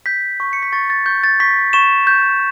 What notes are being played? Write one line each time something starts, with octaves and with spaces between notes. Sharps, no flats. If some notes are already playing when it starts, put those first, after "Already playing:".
G6 B6
C#6
C#7
B6
C#6 A6
A6
C#6 G6
A6
C#6 B6
C#6 E7
G6